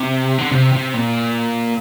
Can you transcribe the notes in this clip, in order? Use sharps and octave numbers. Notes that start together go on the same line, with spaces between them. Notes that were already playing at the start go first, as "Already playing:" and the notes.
Already playing: C3
D3
C3
C3
A#2